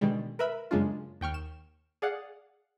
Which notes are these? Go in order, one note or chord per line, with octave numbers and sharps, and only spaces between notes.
B2 D3 D#3 G3 G#3
A#4 B4 E5 B5
F#2 C#3 G#3 A#3 D4 F4
D#2 G5 C#6 F6
E7
G#4 D5 F5 F#5